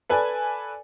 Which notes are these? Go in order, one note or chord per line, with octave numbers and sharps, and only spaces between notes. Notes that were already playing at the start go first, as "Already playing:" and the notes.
A4 B4 D5 G#5